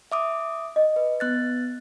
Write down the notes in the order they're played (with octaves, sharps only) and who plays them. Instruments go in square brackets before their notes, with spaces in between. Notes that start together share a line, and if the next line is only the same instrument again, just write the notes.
[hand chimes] E5 D6 D#6
[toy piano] D#5
[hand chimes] B4
B3 F#6 A6